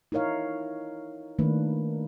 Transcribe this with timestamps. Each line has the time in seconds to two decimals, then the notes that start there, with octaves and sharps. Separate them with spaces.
0.12 D#4 E4 A#4 C#5 F5
1.39 D#3 A3 A#3 D4 B4